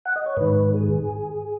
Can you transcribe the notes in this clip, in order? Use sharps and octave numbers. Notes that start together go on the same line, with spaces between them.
F#5
D#5
C#5
G#2 D#3 B4
G#4